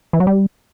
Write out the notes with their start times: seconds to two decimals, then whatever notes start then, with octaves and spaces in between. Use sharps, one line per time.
0.13 E3
0.20 F#3
0.27 G3